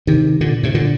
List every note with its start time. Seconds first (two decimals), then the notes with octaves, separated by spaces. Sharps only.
0.07 C3 D#3
0.41 A#2 D3
0.63 A2 C3
0.74 A#2 D3